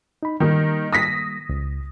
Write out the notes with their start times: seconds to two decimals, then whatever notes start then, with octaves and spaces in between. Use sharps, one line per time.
0.23 D#4 B5
0.40 D#3 G3 A#3 D#4
0.92 D#6 A#6 B6
1.49 C#2